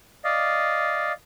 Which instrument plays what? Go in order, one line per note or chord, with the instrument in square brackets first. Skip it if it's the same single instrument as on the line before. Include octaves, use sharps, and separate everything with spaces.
[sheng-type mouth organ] D5 D#5 F5